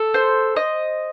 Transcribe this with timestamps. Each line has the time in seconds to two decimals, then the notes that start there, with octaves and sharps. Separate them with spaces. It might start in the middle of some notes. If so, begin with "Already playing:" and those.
Already playing: A4
0.14 C5
0.56 D#5